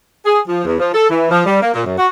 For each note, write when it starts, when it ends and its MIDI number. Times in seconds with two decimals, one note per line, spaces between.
0.25 0.40 68
0.47 0.63 53
0.65 0.76 40
0.79 0.93 53
0.93 1.08 69
1.09 1.28 52
1.31 1.42 53
1.46 1.60 55
1.61 1.70 58
1.73 1.84 46
1.84 1.95 42
1.98 2.07 66